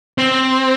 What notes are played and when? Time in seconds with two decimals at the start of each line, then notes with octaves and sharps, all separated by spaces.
0.18 C4